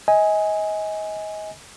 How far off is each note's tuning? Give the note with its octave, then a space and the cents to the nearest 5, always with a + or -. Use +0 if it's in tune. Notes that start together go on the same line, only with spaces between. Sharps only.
D#5 +30 G#5 +0